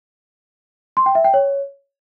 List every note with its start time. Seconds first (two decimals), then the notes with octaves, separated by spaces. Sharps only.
0.97 C6
1.06 G5
1.15 E5
1.24 G5
1.34 C#5